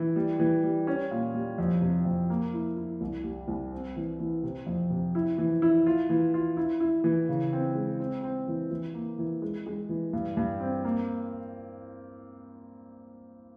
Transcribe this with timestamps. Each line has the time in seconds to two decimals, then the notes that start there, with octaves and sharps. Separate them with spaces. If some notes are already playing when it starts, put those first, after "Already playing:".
Already playing: E3
0.16 G3
0.40 E3
0.63 G3
0.87 C#4
1.11 A#2
1.34 G3
1.58 F2
1.82 C3
2.05 F2
2.30 A#3
2.53 E4
2.77 E4
3.01 C2
3.24 G3
3.48 C2
3.72 C4
3.96 E3
4.20 E3
4.43 C3
4.66 F2
4.90 C3
5.15 E4
5.38 E3
5.62 E4
5.86 F4
6.10 E3
6.34 F4
6.57 E4
6.80 E4
7.04 E3
7.29 C#3
7.53 C4
7.75 G#3
7.99 C4
8.23 C4
8.48 E3
8.71 E3
8.94 A#3
9.19 E3
9.42 G#3
9.66 G#3
9.89 E3
10.13 G2
10.37 G2
10.60 C4
10.84 A#3